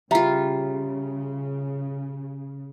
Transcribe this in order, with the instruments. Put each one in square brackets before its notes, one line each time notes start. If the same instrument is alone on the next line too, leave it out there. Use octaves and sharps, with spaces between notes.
[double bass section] C#3 [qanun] G3 F4 [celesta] E5 A#5